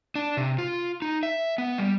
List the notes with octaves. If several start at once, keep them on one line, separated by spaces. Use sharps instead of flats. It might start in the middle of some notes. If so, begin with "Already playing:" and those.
D4
C3
F4
D#4
E5
B3
G3